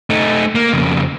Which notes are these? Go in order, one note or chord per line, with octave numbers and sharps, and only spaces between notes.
A3 D#4
A#3
F2 C#3